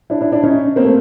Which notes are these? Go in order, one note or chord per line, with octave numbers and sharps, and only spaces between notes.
D4 E4
D4 E4
D4 E4
C#4 D#4
A#3 C4
A3